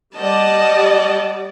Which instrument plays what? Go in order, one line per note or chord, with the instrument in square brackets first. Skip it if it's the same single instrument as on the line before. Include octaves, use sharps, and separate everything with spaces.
[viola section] G3 D5 [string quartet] D#5 F#5 A5